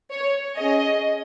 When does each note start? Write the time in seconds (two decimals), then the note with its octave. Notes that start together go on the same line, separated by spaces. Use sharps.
0.11 C#5
0.57 C#4 G#4 D#5